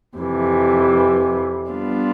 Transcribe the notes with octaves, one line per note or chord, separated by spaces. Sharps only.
F2 C3 E3
G3 B3 D4 F4